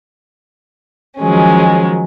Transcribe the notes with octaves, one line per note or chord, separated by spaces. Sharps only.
D#3 F3 F#3 G#3 C#4